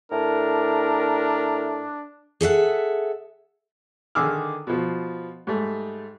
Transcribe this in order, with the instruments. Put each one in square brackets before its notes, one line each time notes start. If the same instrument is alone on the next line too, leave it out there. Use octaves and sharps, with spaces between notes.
[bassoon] A2 [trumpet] D4 [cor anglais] A#4
[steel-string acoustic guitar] G#4 A4 E5 F#5
[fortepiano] D3 D#3 G#4 D6 E6 F6
B2 F3
G#2 G3 A3